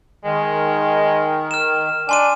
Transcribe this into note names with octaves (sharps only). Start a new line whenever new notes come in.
D#3 G#3
F6 E7
D4 G#5 C6 D#7